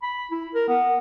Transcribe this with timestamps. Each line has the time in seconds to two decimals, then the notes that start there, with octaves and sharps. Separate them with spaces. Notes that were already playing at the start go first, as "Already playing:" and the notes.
0.03 B5
0.31 E4
0.54 A#4
0.68 B3